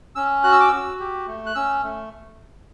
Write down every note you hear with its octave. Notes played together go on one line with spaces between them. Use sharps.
C#4 E6
F#4 F#6
E6
D6
F#4 E6
G4
A3
F#6
C#4 E6
A3